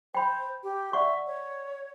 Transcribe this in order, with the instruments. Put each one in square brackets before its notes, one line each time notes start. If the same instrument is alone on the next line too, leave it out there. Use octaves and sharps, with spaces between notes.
[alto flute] C5 [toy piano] G5 B5
[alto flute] G4
[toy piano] D5 F#5 C#6 [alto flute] E5
[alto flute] C#5